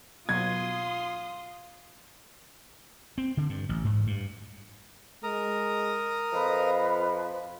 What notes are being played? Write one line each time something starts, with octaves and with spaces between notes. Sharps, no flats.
B2 F#3 F4 C6 D#6 G#6
C4
D3
G2
A1
G#2
G2
G#3 A#4 A#5 D#6
F2 F3 B4 D#5